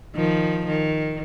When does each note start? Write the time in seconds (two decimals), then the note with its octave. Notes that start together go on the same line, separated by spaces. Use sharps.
0.15 D#3 F3
0.67 D#3